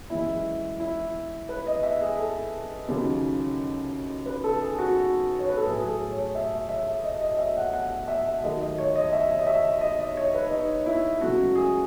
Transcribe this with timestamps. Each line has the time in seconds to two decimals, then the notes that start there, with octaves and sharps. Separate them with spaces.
0.10 F#2 E3 G#3 E4
0.80 E4
1.49 B4
1.67 D#5
1.83 E5
2.01 G#4
2.18 A4
2.88 D#2 C#3 F#3
4.26 B4
4.44 A4
4.62 G#4
4.78 F#4
5.39 C#5
5.49 B4
5.57 A4
5.65 A2 F#3 A3 G#4
5.80 G#4
5.88 A4
6.12 C#5
6.35 E5
6.69 E5
7.04 D#5
7.21 D#5
7.38 E5
7.57 F#5
7.73 F#5
8.08 E5
8.42 D#2 D#3 F#3 A3 D#5
8.61 D#5
8.78 C#5
8.96 D#5
9.12 E5
9.39 D#5
9.47 E5
9.81 D#5
10.00 D#5
10.17 C#5
10.34 B4
10.51 D#4
10.86 E4
11.21 C#2 C#3 F#3 A3 F#4
11.55 G#4